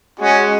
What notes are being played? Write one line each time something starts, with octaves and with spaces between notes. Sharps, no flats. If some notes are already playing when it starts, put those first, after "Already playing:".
G#3 C#4 F#4